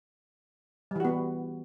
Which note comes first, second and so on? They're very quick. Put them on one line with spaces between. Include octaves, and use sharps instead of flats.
G3 E3 F#4 B3